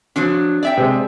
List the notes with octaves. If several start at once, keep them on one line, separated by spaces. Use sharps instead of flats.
F3 F#3 D4
D5 E5 G5
C3 G#3